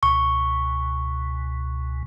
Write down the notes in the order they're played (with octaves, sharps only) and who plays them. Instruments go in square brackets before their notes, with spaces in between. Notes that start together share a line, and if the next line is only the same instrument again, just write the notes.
[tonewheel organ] C#2 B2 [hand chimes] C#6